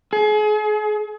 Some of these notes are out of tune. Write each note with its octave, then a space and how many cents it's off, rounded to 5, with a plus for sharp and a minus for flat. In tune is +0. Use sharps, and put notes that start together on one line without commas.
G#4 +35